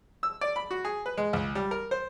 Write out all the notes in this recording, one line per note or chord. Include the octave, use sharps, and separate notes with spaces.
E6
D5
B5
F#4
G#4
B4
G#3
C#2
G3
A#4
C5